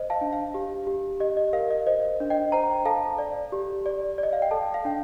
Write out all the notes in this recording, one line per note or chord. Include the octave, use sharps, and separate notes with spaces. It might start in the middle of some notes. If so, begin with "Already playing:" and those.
Already playing: C5 D#5
F5 A5
D4
F5
G4
G4
G4 D#5
D#5
A#4 F5
D#5
C5 D#5
D4
D#5 G5
C5 G5 A#5
A4 F5 A5
D5
G4
D5
D5
D#5
F5
G5
A4 F5 A5
F5
D4 G5